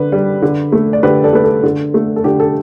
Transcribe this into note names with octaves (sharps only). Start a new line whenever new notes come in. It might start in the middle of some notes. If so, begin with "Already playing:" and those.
Already playing: D3 B4
G3
D3
A3
D5
D3 G4 B4
A4 D5
A3 B4
A4
D3
A3
A4
D3 G4
A4